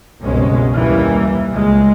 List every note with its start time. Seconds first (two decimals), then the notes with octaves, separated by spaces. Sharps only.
0.22 F#1 C2 B2 G#3 C#4
0.73 D#2 E3 G3 A#3
1.51 C#2 G#3